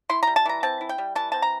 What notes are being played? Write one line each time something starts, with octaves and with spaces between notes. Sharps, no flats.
E4 C6
G3 A#5
A5
E3 A#5
C4 A5
E4
G5
G3
E3 A5
C4 A5
A#5